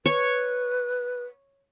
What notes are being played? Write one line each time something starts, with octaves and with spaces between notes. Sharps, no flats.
B4 C#5